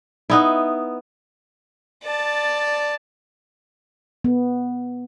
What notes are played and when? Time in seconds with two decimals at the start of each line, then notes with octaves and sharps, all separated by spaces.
0.30 B3 D#4 E4
2.04 D5 A5
4.24 B3